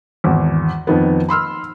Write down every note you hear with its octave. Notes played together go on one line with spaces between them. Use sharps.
G#1 E2
F2 D#3 B3
B5 C6 E6 F6